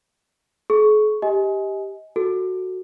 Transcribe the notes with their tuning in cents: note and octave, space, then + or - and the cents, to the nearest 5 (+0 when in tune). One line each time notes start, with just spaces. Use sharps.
G#4 +45 C#6 +0
G4 +0 D#5 +30 G#5 +15
F#4 +0 A4 +10